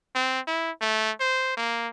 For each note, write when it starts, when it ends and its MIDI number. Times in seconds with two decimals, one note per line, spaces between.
0.15 0.40 60
0.47 0.71 64
0.81 1.11 57
1.20 1.56 72
1.57 1.88 58